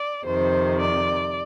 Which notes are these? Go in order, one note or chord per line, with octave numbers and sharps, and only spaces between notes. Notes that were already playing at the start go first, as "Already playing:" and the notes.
Already playing: D5
F2 C3 D#3 C5
D5